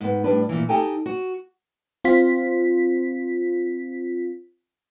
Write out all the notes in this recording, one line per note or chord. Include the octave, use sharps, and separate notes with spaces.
G#2 B3
A2 G3 D4 B4
A#2 E3
D#4 G4 A4 G5 G#5
F#4
C4 F4 B6